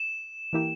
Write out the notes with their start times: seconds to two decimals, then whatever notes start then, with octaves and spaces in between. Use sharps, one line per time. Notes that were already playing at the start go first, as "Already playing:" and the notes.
Already playing: E7
0.53 E3 A#3 E4 G4